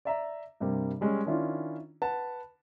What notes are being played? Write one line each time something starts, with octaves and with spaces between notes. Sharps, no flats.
D5 E5 A#5
G2 C3 G3 A#3
G3 G#3 C#4
D#3 C#4 D4 E4 F4
B4 F#5 A5